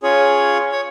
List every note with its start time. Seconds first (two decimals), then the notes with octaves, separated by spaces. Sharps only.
0.03 C#4 F4 G#4 C#5
0.72 C#5